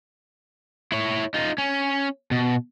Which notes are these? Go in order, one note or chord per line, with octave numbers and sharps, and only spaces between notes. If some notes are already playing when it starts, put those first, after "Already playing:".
E4 C#5
D#4 F4
C#4
B2